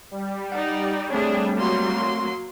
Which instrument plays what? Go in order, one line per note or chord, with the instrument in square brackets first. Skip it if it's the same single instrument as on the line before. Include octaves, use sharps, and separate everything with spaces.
[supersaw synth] G3
[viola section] D#4 D5 [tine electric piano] F#5
[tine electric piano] A3 C4 C#5 [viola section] D4 G#4
[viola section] F#3 A#3 C6